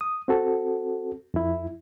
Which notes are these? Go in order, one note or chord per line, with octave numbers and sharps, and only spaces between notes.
D#6
C4 F#4 A4
F2 E4